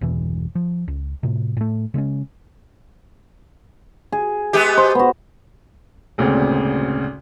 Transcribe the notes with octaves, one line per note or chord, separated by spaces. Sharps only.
G1 E2 B2 E3
F3
C#2
A2 C3
A2 A3
C#3 G#3 C4 C#4
G#4
G#3 B3 G4
C5
B3 F#4
G#1 D2 A#2 C#3 C4